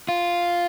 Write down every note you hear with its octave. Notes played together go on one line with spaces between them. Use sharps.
F4